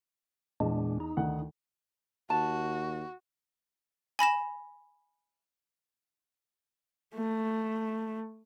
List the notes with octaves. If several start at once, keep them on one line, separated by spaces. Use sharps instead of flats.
E2 A#2 G#3 D4
D#4
D2 D#3 F#5
D#2 F#4 A5
G#5 B5 A#6 E7
A3